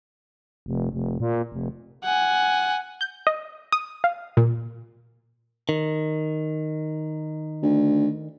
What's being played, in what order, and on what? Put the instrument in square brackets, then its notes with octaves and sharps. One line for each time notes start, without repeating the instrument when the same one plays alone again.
[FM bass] F1
F1
A#2
F1
[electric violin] F#5 G#5
[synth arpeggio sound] G6
D#5
D#6
F5
A#2
[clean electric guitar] D#3
[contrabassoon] D2